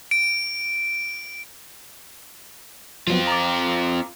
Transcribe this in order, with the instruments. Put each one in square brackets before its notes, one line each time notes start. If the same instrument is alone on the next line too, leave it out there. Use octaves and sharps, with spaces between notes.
[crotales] D7
[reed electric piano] F3 F#3 B3 [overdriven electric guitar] C4 F4
[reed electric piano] A#5 D6